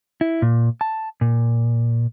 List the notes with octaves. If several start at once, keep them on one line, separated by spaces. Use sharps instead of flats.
E4
A#2
A5
A#2